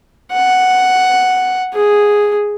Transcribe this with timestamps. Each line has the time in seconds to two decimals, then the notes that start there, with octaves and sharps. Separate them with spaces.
0.32 F#5
1.74 G#4